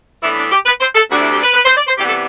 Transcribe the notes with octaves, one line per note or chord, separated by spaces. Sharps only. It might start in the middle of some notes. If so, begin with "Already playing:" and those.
A2 E3 B3 D4 E4
D4
G4
B4
C5
A4
D2 C3 G3 D4 F#4
E4
G4
B4
B4
C5
D5
C5
C3 E3 G3 B3 G4
A4